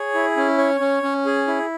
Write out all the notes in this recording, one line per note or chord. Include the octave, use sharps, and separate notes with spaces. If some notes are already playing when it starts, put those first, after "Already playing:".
Already playing: G#4 C#5
E4
C#4
C#5
C#4
C#4
G#4
E4